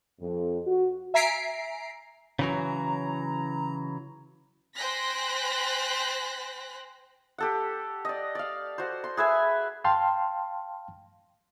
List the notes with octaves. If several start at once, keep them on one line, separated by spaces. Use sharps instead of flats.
F2
F#4
E5 G#5 A#5 B6 C7 D7
C#3 E3 F#3 A#5
C5 G5 G#5 F#6 A#6 B6
G4 A4 F#5
D5 D#5
D5 F5
F#4 C5
C6
G#4 B4 E5 G#5
F5 G5 A5 C6 F6